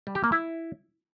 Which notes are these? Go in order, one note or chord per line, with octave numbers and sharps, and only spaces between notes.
G3
G4
A#3
E4